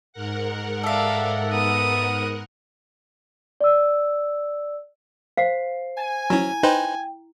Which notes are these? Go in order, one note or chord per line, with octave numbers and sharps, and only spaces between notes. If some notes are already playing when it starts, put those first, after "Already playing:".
G#2 A#4 F#5
A4 D5 E5 F5
B3 D#6
D5 E6
C5 F5 C7
G#5
F#3 C#4 E4 A#5
D#4 B4 C5 G5